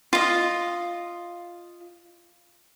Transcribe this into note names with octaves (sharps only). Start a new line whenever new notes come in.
F4 D#5